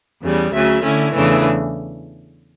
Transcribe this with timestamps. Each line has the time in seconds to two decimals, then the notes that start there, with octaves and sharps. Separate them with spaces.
0.21 E2 C#3 G3
0.52 D2 C#3 F#3 E5
0.83 D3 A3 C#4 E4
1.14 E2 C#3 E3 A3 D4